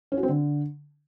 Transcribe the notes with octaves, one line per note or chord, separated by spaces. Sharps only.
C#4
F#4
C4
D3